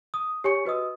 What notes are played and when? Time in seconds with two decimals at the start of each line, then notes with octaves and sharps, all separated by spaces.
0.14 D#6
0.44 G4 C#5 G#5 C#6 C#7
0.65 F#4 B4 D#5 D#6 E6